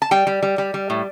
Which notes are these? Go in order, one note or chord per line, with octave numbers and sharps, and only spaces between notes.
A5
G3 G5
G3
G3
G3
G3
A2